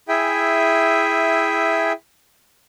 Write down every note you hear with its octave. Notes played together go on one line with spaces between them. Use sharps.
E4 G#4 E5 G5 G#5